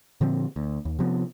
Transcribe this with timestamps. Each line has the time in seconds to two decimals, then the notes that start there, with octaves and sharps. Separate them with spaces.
0.21 A#2 D3 F3 C4
0.56 D2
0.85 D#2
0.99 C3 F3 B3